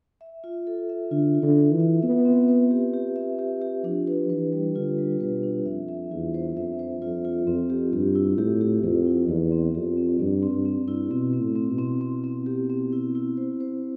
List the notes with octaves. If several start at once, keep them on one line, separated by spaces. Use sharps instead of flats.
E5
F4
A4
E5
D3 F4
F4
D3
F4
E3
E5
B3 E5
C4
B4
G4
G4
E5
G4
G4
F3 D4
B4
E3 B4
G3
D3 F4
G3
B2 B4
D4
F2 E5
E5
E2 F4
C5
F2 E5
C5
F2 F4
F4
F2 C4
G4
G2 G4
E4
A2 G4
G4
F2 G4
E4
E2 D5
C4
F2 G4
C4
G2 D5
C4
G2
C4
G2
E4
B2 C4
C4
A2
C4
B2
C4
C4
C4
G4
C4
E4
E4
C5
C5